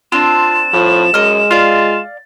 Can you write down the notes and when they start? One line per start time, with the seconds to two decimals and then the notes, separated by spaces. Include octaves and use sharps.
0.12 C4 D4 F4 E7
0.74 A2 F3
1.14 F#2 G#3 D#5 F6
1.51 F4 D5 F5